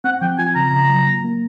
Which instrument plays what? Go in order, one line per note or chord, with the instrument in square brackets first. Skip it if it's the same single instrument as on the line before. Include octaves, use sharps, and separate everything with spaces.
[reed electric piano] C4 [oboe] F#5
[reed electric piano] F3 [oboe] G5
[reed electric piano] F4 [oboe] G#5
[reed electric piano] C#3 [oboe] A#5
[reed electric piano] C#3
F#3
A#3
A#3